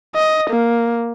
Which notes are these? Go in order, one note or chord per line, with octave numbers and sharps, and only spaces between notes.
D#5
A#3